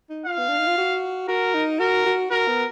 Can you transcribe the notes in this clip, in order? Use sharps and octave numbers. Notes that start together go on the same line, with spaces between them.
D#4
F4 F5
B3
D4
D#4
F4
F#4
F#4 A#4
D#4
F#4 A#4
F#4
F#4 A#4
B3